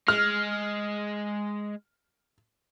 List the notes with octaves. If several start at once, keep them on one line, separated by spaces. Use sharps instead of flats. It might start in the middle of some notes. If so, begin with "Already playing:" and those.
G#3 F6